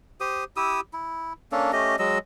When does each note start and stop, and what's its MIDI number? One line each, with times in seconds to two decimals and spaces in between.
0.20 0.44 67
0.20 0.44 72
0.20 0.44 87
0.56 0.80 64
0.56 0.80 67
0.56 0.80 87
0.56 0.80 88
0.93 1.33 64
1.52 1.72 58
1.52 1.72 61
1.52 1.72 62
1.52 1.72 69
1.73 1.96 57
1.73 1.96 61
1.73 1.96 67
1.73 1.96 75
1.99 2.18 54
1.99 2.18 56
1.99 2.18 75
1.99 2.18 88